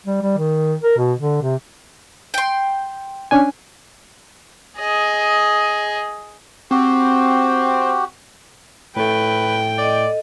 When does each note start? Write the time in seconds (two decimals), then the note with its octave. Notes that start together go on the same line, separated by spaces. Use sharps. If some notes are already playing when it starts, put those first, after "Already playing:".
0.06 G3
0.21 G3
0.37 D#3
0.83 A#4
0.97 B2
1.19 D3
1.42 C3
2.34 G5 C6
3.31 C#4 D4 G#5
4.78 G#4 D#5
6.71 C4 F#4 G4
8.96 A2 A3 B4 G5
9.78 A4 D5 D#5